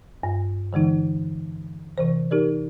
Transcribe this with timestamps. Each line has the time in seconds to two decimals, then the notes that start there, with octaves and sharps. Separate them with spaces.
0.23 G2
0.73 D3 E3 G#3 D#4
1.98 C3 E3 C5
2.31 D#4 G4 A#4 D5